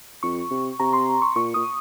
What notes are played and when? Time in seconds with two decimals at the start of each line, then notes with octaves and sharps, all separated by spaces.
0.23 F2 C#6
0.51 C3
0.80 C3 A#5
0.93 C6
1.22 C#6
1.36 A#2 C#6
1.54 A#2 D#6